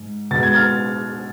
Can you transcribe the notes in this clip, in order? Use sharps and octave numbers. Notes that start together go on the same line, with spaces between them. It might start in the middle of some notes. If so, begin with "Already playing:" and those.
Already playing: G#2
B2 G#3 A6
G#6
F6 A6